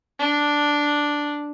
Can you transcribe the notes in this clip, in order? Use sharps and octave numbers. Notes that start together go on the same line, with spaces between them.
D4